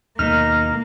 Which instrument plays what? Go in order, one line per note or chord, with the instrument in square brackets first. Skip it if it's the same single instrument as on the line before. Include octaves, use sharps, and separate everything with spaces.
[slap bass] D#2 B2 [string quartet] A#3 [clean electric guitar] D#4 [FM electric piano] F6